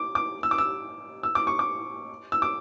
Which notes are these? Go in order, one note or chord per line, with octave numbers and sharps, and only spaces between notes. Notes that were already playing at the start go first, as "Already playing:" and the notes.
Already playing: D6
D6
E6
D6
E6
E6
D6
C#6
D6
E6
D6